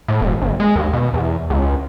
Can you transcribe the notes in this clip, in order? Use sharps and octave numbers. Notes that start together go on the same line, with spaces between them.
A2
E1
G1
G#3
D#2
B2
E2
C#2